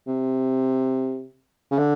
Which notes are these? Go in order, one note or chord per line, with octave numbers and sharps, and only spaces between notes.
C3
C#3
D3